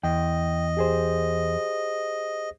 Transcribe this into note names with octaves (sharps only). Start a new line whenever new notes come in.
E2 D#5 G5
G4 G#4 C5